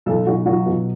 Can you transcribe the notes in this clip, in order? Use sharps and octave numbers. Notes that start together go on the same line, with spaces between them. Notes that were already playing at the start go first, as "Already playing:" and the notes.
B1 A4
B1 F#4
F#3 F#4
B2